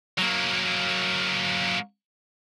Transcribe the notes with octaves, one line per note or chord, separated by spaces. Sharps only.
F#3 A#3